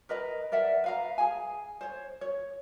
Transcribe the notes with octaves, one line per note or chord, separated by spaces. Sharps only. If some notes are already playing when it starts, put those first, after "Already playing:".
A#4 B4 D#5 A#5
A#4 D5 E5 F#5
B4 F5 A#5
G#4 G#5
C5 C#5
C#5